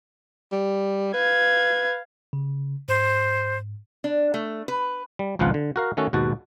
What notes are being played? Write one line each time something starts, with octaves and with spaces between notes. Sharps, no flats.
G3
B4 F5 G#6
C#3
G#2 C5
D4
A3
B4
G3
G#1 C#2 F3 B3 F4 F#5
D3
F#4 A#4 F5
D#3 A3 C#4 F#4 A4
D#2 G#2 B2 F#4 A5